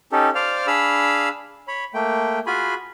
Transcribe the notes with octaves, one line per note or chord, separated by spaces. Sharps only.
C#4 D#4 G4 A4
C5 D5 F5 F6
D4 G#4 F5 B5 E6
C#5 B5
A3 A#3 G5
F4 F#4 G#4 G#5 B5